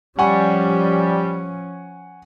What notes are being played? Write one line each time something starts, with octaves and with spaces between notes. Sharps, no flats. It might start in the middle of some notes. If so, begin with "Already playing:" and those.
F3 G3 C#4 F#5 G#5 C#6